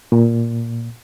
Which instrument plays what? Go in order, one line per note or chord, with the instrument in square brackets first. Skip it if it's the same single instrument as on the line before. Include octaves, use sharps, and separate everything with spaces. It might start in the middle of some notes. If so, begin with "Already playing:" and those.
[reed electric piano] A#2